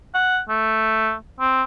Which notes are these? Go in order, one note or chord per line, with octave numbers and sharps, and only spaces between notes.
F#5
A3
C4